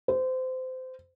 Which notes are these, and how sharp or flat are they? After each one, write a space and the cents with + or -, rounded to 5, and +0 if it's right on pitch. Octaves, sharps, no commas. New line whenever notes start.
C5 -25